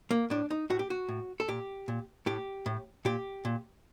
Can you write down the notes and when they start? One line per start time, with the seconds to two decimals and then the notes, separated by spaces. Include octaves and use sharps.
0.11 A#3
0.30 A2 D4
0.51 D#4
0.70 A2 F#4
0.79 G4
0.90 F#4
1.09 A2
1.40 A4
1.48 A#2 G4
1.88 A#2
2.26 A2 G4
2.66 A2
3.05 A#2 G4
3.45 A#2